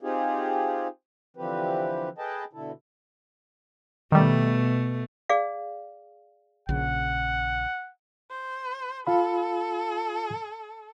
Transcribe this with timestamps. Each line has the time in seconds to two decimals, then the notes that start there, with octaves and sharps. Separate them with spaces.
0.02 C4 D#4 F4 G4 G#4
1.37 D3 E3 F3 C4 G4 B4
2.18 G#4 A4 B4 D#5 G5 A5
2.53 B2 D3 E4 A4
4.12 B2 D#3 G3 A3
5.29 G#4 D5 F5
6.69 A#1 C#3 F#5
8.31 C5
9.07 F4 A4 F5 B5